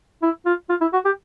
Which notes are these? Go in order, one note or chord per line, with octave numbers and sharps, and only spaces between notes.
E4
F4
F4
E4
F#4
G4